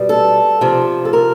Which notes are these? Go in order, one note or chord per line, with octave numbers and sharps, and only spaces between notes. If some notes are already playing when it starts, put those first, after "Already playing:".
Already playing: B2 G3
A4
C3 F3
A4
A#4